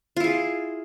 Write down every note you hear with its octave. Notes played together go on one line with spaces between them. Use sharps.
E4 F4 G#4